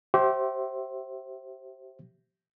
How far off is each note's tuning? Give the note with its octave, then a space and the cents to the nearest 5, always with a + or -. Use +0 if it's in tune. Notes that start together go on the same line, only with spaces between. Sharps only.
G4 -30 C5 +15 E5 +0